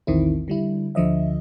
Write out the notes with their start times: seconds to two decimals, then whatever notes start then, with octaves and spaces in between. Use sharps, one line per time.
0.07 A#1 E2 D#3 C4 E4
0.48 D3 G3 E4
0.95 D2 D3 F3 D#5 E5